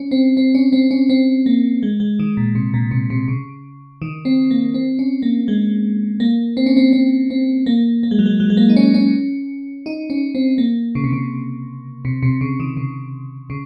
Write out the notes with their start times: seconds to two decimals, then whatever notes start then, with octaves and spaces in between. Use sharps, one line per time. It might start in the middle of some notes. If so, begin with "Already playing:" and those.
Already playing: C#4
0.11 C4
0.37 C4
0.55 C#4
0.72 C4
0.91 C#4
1.09 C4
1.46 A#3
1.83 G#3
2.00 G#3
2.19 D#3
2.37 A#2
2.55 C3
2.74 A#2
2.91 C3
3.10 C3
3.28 C#3
4.02 D#3
4.25 C4
4.51 A#3
4.74 C4
4.99 C#4
5.22 A#3
5.48 G#3
6.20 A#3
6.57 C4
6.66 C#4
6.77 C4
6.93 C4
7.30 C4
7.66 A#3
8.03 A#3
8.11 G#3
8.19 F#3
8.26 G#3
8.40 F#3
8.50 G#3
8.57 A#3
8.69 D#4
8.76 C#4
8.94 C#4
9.86 D#4
10.10 C#4
10.35 C4
10.58 A#3
10.95 C#3
11.04 C3
11.12 C#3
12.05 C3
12.23 C3
12.41 C#3
12.60 D#3
12.77 C#3
13.50 C#3